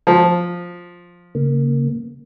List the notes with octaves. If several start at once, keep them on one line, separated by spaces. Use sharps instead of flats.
F3
C#3 A#3